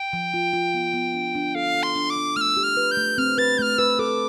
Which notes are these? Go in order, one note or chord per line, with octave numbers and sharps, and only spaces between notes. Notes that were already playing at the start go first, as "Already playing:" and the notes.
Already playing: G5
F3
F4
F4
B3
B3
D4
D4
A4 F5
A4
C6
D4
D6
D4
A3 E6 F6
G4
F6
B4
G6
A3
C4 F6
B4 A6
A3 F6 G6
B4 E6
A4 D6